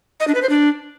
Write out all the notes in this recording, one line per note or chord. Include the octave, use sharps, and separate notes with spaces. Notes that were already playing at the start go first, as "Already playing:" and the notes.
D#5
D4
B4
C5
D4